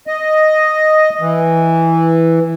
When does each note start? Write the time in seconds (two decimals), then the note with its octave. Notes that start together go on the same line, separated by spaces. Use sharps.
0.07 D#5
1.21 E3